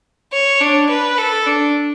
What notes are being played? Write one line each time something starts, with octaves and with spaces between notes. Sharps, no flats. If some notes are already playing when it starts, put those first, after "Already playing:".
C#5
D4
B4
A4
D4